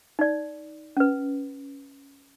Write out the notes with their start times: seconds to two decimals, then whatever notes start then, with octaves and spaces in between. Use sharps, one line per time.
0.19 D#4 D5
0.97 C#4 B4